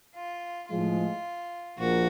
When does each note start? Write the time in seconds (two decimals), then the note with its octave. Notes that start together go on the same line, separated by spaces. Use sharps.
0.15 F4
0.70 A2 F3 G#3 F4
1.78 A#1 A#2 F3 A#3 F#4